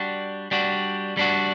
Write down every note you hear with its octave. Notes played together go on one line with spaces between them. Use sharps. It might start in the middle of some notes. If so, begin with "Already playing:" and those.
Already playing: G3 D4 F#4
G3 D4 F#4
G3 D4 F#4